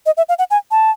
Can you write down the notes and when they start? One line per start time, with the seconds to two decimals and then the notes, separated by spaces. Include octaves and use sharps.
0.06 D#5
0.17 E5
0.29 F5
0.39 F#5
0.50 G#5
0.71 A5